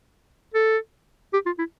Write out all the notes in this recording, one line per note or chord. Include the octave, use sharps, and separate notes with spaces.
A4
G4
F4
E4